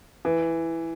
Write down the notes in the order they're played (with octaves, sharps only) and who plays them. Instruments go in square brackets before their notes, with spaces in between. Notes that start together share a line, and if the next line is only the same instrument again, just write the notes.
[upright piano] E3